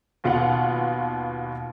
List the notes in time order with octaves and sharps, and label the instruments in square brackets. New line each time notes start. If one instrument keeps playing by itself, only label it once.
[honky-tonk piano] D#2 B2 F4 F5 F#5